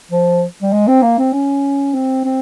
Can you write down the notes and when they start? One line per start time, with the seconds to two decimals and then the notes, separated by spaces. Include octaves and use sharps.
0.11 F3
0.62 G3
0.72 G#3
0.88 C4
1.03 A#3
1.18 C4
1.33 C#4
1.94 C4
2.24 C4